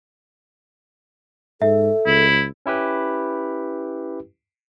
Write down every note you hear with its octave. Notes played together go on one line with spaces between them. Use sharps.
G#2 A4 E5
C#2 E4
C#4 E4 G4 B4